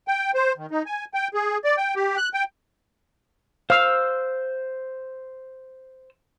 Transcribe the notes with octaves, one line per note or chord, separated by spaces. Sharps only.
G5
C5
D#3
D#4
G#5
G5
G#4
D5
G5
G4
F#6
G5
C5 F5 E6